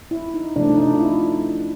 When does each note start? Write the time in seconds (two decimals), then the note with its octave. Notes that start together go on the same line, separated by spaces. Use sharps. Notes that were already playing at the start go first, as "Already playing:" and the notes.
0.11 E4
0.34 D#4
0.56 C3 F3 A3 D4
0.70 D#4
0.78 D4
0.94 F4
1.01 E4